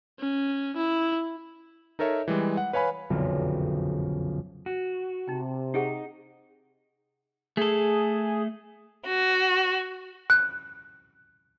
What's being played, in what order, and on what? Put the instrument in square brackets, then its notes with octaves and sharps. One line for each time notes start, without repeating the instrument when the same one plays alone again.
[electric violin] C#4
E4
[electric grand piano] D#4 A4 A#4 C#5 E5
E3 G3 G#3
F#5
B4 C#5 F5 G#5 B5
[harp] F#1 B1 F2 D3
[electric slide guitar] F#4
[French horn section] C3 [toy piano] D#4 G5
[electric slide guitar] D#4 [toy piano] G4 G#4 F#5
[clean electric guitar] A3 A4 [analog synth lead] G#4
[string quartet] F#4
[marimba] F#6